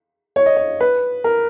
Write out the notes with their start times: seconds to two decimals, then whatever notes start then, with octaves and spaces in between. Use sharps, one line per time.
0.36 C#5
0.46 D#5
0.57 C#5
0.80 B4
1.24 A#4